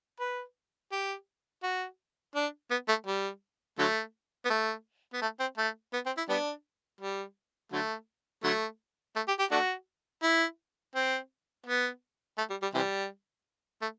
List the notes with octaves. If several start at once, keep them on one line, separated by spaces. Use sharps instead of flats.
B4
G4
F#4
D4
B3
A3
G3
D3 F#3 A3
B3
A3
B3
A3
C4
A3
B3
C4
E4
G3 B3 D4
G3
D3 F#3 A3
D3 F#3 A3
A3
G4
G4
A3 D4 F#4
E4
C4
B3
A3
G3
G3
C3 E3 G3
A3